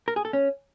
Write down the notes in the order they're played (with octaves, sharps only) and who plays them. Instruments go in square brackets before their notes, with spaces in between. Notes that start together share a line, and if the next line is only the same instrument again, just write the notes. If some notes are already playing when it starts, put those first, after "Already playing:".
[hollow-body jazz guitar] A#4
G#4
A4
C#4